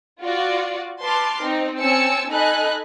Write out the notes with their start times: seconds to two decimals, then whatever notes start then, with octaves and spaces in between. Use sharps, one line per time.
0.21 F4 F#4 D5
1.02 B4 A5 C6 D6 F6
1.42 C4 D#4
1.78 C4 C#4 G#5 A5 E6 C#7
2.30 D#4 A4 D#5 G#5 B5 F#6